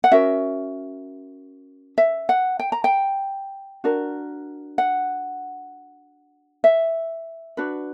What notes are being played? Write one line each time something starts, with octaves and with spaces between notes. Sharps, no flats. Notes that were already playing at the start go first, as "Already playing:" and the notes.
F#5
C#4 F#4 A#4 E5
E5
F#5
G5
A#5
G5
D4 F#4 A#4
F#5
E5
D4 F#4 B4